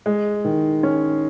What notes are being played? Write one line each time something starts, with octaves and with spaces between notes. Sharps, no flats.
G#3
D#3
C#4